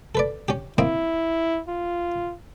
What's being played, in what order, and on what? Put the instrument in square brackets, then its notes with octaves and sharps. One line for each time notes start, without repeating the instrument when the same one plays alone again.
[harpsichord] A4 B4 D5
C#4 G4
[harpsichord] A#3 C4 D#5 [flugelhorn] E4
[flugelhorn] F4